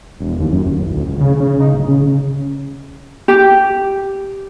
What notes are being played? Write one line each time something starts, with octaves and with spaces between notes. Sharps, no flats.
E1
D#2
F#2
D1
A1
D2
C#2
C#3
C#3
D#4
D1
C#3
G4